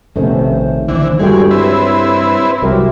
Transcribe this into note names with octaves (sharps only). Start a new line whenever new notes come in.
A#1 C3 D#3 A3 B3 C#4 C5
D#2 D3 E3
G2 G3 G#3 F#4 A4 G5
C4 E4 B4 C#5
C2 F#3 G4 A#4 E5